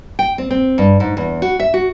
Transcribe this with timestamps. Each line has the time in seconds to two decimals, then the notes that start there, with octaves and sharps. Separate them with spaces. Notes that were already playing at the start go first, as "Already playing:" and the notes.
0.19 G5
0.38 C4
0.51 C4
0.78 G2
1.00 G#2
1.17 E2
1.42 F#4
1.60 E5
1.74 F#4